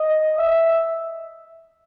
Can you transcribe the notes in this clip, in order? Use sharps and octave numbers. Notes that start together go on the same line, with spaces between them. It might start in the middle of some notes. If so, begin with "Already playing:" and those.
Already playing: D#5
E5